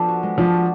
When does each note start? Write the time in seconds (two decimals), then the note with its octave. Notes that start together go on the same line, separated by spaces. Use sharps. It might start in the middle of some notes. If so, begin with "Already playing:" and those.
Already playing: F3 B3 D4 A4
0.08 F#4
0.23 G#3
0.38 F3 D4
0.53 F#4